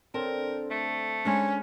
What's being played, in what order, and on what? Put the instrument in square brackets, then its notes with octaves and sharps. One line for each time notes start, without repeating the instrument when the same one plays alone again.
[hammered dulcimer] D3 C4 C5 [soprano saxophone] A#4 [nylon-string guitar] A5
[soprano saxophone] A3
[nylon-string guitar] G#3 D4 [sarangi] C#4